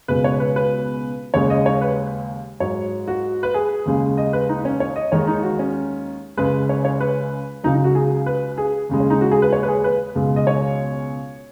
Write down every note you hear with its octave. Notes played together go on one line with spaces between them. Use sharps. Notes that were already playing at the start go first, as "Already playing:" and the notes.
C#2 B2 G#3 B4
C#5
B4
B4
D#2 C#3 G#3 C#5
D#5
C#5
B4
G#2 F#3 C#5
F#4
B4
G#4
D#2 C#3 G#3
D#5
B4
D#4
C#4
C#5
D#5
D#2 D#3 G#3 C#5
D#4
F#4
C#4
C#2 C#3 G#3 B4
C#5
C#5
B4
C#2 C#3 F#3 D#4
D#4
F#4
G#4
B4
G#4
D#2 C#3 G#3
C#4
D#4
F#4
G#4
B4
C#5
B4
G#4
B4
C#2 B2 G#3
D#5
C#5